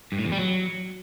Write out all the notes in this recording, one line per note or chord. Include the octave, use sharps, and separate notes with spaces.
G2
A2
E2
G3
F#3